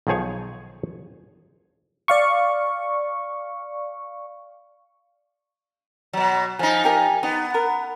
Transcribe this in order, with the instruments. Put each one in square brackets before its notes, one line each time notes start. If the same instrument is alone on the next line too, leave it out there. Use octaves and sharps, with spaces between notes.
[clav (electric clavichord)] B1 D#3 F3 G#4 C#5 G#5
[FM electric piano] D5 F5 C#6
[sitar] B2 F#3
[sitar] F3 D#4 [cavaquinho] G#5
[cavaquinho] G4 A#4 G#5
[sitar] B3 [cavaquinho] D#4
[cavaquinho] A#4 F#5